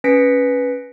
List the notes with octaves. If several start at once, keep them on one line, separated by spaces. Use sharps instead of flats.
C#4 B4 A#6 B6 C#7 D7